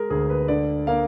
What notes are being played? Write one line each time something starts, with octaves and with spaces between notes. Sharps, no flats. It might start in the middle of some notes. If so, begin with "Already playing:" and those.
Already playing: G#3 G#4 A#4
D2 G#4
B4
D3 D5
A#3 F5